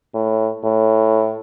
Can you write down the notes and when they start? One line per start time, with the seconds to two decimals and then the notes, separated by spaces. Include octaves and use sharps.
0.14 A2
0.64 A2